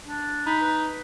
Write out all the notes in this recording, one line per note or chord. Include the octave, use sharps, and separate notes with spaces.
D4
D#4 B5
B4